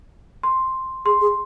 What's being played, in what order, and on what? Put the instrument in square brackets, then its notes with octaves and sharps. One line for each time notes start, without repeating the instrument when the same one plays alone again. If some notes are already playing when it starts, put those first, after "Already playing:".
[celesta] C6
[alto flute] G#4 [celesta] C6
[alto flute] G#4